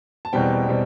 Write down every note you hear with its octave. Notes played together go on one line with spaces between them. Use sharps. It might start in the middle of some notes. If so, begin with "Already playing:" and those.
A5
E2 B2 G3 C4 G5
B2 G3 C4